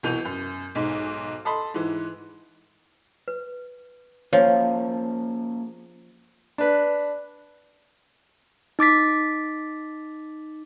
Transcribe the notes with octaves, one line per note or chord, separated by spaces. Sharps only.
C2 B2 E3 G6 D#7 F7
F#2
B1 G#2
A4 D#5 B5 C6
G#2 E3
B4
F3 A#3 C#4 G#4 C#5
D4 B4
D#4 D6 A6 B6